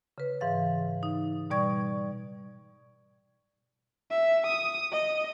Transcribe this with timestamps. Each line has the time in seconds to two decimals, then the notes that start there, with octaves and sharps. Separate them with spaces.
0.18 C#3 B4
0.41 G#2 E3 F5 A6
1.03 D#4
1.50 B2 G3 D5 C#6 G#6
4.10 E5
4.46 D#6
4.92 D#5